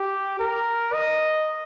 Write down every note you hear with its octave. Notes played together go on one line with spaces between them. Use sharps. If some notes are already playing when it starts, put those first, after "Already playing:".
Already playing: G4
A#4
D#5